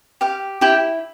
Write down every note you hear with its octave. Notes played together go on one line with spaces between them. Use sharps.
G4 F5
E4 G4 G5